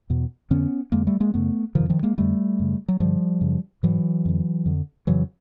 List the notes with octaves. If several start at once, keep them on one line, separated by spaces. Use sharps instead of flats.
E2 B2
F2 D3 B3 C#4
F2 D3 G#3 A#3
G3 A3
G#3 A#3
F#2 C#3 A3 B3
C3 D#3 F3
F2
D#3 F3
G#3 A#3
F2 D3 G3 A3
F#2 C#3
F#3
G2 D3 F3 G3
F#2 C#3
G#2 E3 F#3
F2 D3
F2 D3
F2 C#3 E3 F#3